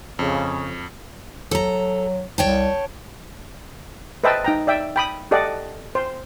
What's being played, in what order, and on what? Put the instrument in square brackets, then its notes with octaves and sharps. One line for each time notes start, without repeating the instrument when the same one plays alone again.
[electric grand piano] F2 [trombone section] C#3
[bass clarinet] F#3 [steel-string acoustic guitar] A4 A#5
[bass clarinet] C2 [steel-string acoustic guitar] C#5 G5 A5
[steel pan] B4 C5 D#5 E5 G5 A5
D#4 G5 A#5
D5 E5 G5
G5 B5 D#6
G4 A4 D5 D#5 F#5
C5